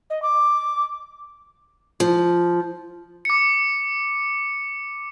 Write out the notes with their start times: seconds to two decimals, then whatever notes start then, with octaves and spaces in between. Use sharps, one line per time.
0.10 D#5
0.22 D6
2.00 F3
3.25 D6 C#7